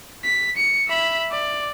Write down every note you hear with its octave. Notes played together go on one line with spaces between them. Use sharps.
B6
C#7
E5 B5
D5